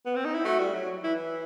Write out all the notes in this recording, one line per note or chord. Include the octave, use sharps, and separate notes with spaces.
B3
C4
D#4
E4
A3 F#4
G3
F#3
E3 E4